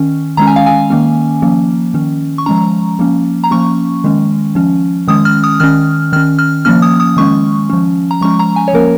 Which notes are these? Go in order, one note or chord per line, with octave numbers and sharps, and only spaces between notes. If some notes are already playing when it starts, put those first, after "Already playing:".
Already playing: D#3 C#4
D#3 G#3 C#4 A#5
G#5
F5
G#5
D#3 A#3 C#4
F3 A#3 C#4
D#3 C#4
C#6
F3 G#3 C#4 A#5
F3 A#3 C#4
A#5
F3 A#3 C#4 C#6
D#3 G#3 C#4
F3 C#4
D#3 G#3 C#4 D#6
F6
D#6
D#3 C#4 F6
D#3 C#4 F6
F6
F3 A#3 C#4 F6
D#6
D#6
D#3 G#3 C#4 C#6
F3 C#4
A#5
F3 G#3 C#4 C#6
A#5
G#5
C#5
F3 A#3 C#4 A#4